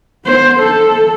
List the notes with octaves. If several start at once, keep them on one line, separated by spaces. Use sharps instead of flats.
B3 C5
A4